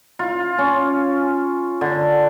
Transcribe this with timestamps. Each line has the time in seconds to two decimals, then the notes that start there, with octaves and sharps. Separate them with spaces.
0.19 F4
0.58 C#4
1.81 D3